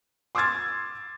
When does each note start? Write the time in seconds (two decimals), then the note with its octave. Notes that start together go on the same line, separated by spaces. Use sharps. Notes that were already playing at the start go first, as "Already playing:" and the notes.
0.35 C6 D6 E6 F6 G#6 A6